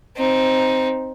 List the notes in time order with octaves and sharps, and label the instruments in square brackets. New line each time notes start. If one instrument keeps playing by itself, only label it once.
[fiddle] C4 D#4